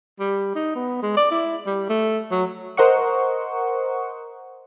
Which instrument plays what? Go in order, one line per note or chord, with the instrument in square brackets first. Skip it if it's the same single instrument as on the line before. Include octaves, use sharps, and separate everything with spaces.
[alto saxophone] G3
D#4
B3
G#3
D5
E4
G3
A3
F#3
[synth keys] A#4 C5 D#5 F#5 C#6